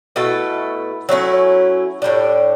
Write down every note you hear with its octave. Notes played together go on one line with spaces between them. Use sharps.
B2 A3 E4 A4
F#3 A3 C#4 E4
A2 G3 D4